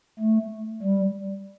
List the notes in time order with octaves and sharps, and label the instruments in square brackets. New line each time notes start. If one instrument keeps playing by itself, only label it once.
[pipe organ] A3
G3